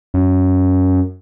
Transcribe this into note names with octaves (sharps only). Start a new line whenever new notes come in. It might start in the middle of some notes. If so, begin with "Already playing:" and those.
F#2